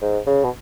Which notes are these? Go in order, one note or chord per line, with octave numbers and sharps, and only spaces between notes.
G#2
C#3
B2